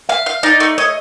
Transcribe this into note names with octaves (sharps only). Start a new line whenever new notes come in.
E5 F5
F5
D#4 D5
A3
C#5 D#5